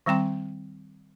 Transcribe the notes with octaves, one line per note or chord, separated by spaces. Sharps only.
D#3 G3 C4 G5 C6